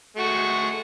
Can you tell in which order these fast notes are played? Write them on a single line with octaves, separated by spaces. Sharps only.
A3 F#4 G#3